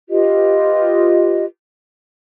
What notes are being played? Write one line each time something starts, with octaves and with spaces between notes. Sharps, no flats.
F4 G4 B4 D#5